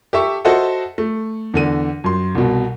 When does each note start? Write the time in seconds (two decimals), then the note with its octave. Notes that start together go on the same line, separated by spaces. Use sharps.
0.13 G4 A4 E5 C#6
0.45 F#4 A4 C5 D#5 E5 F#5
0.98 A3
1.54 E2 D3 D#7
2.04 F#2 C6
2.35 C2 B2